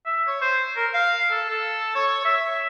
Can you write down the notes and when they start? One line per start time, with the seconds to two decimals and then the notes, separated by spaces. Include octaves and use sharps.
0.05 E5
0.27 C#5
0.41 C5
0.76 A#4
0.94 F5
1.30 A4
1.49 A4
1.95 C#5
2.25 E5